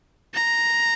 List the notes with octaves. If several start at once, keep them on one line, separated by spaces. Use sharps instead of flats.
A#5